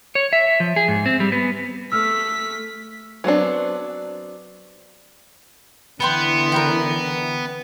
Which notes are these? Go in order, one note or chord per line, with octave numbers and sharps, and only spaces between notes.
C#5
E5
F3
G#4
G#2
C4
G3
B3
A3 E6 F6 B6
F#3 B3 C4 D4
D3 E3 B3 B4 G5 C6
A#4 B4 G5